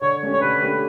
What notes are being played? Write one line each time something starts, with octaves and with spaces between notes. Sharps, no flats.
D3 C#5
A3 C#4 G4
C#5
D3 B4
A3 C#4 G4